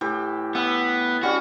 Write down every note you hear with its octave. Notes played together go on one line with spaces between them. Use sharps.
A2 E3 G4
B3 E5 B5
G3 C#4 F#4